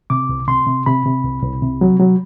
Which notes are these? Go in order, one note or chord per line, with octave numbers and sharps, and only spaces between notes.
C3 D6
C2
C3 C6
C3
C3 B5
C3
C2
C2
C3
F#3
F#3